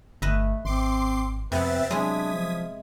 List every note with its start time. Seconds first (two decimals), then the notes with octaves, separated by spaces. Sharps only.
0.22 G1 A3 B4 D#5 E5
0.65 G#1 C4 C6 D6 C7
1.52 F2 C3 B3 C4 B4 E5 A6
1.91 F#3 G#3 D4 E4 D#6 G#6 B6
2.32 F3